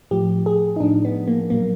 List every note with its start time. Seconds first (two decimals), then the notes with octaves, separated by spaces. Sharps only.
0.11 A2 F3 G4
0.46 G#4
0.76 D#4
0.80 A2 F3 D4
1.05 B3
1.28 A#3
1.50 A#2 F#3 A#3